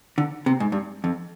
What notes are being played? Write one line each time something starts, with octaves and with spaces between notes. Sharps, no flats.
D3
C3
G#2
G2
F2